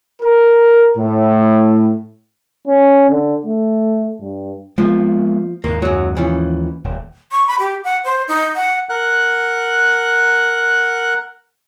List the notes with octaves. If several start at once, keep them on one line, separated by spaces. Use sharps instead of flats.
A#4
A2
C#4
D3
A3
G2
F3 G#3 A#3 B3
D#2 G#2 A#3
F#2 F#3
E3 F3 C#4
D#1
C#6
B5
G4
F#5
C5
D#4
F#5
A#4 F#5 F#6